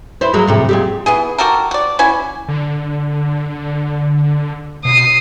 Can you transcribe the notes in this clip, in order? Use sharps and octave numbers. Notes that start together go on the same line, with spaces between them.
E4 B4 C5
F#3 G#3 A#3
F2 A2 C3
A#2 G#3 G4
E3 B3 G#4
F#4 G4 A4 A#4
F#4 D5
C#4 E4 F#4 G#5
D3
B2 D#6 C7